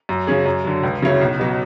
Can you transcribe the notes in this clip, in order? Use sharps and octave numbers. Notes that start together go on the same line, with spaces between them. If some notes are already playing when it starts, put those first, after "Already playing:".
F#2
C#3 F#3 C#4 G#4
F#2
D3 F#3
C#2
C#3 F#3 C#4 E4
B1
B2 F#3